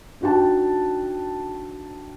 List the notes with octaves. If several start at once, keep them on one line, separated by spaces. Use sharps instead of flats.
D4 D#4 F#4 G5 A5